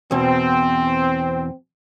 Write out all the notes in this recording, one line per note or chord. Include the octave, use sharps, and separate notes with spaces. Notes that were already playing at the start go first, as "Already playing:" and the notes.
E2 B2 C4